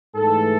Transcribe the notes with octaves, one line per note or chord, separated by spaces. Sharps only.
G#2 E3 A3 A4